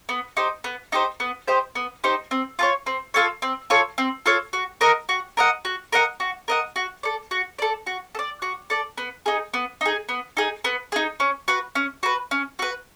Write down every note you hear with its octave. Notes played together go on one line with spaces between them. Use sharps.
B3
D#4 G4 C5
B3
D#4 G4 C5
B3
D#4 G4 C5
B3
D#4 G4 C5
C4
F4 A4 C#5
C4
F4 A4 C#5
C4
F4 A4 C#5
C4
F4 A4 C#5
F#4
A#4 D#5 F#5
F#4
A#4 D#5 F#5
F#4
A#4 D#5 F#5
F#4
A#4 D#5 F#5
F#4
A4 D5
F#4
A4 D5
F#4
A4
D5
F#4
A4 D5
B3
D#4 G#4
B3
D#4 G#4
B3
D#4 G#4
B3
D#4 G#4
C#4
F#4 B4
C#4
F#4 B4
C#4
F#4 B4